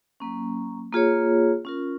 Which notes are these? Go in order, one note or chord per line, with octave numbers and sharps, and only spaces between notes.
F#3 A#3 C#4
A#3 F4 G#4 C#5
C#4 F4 A#4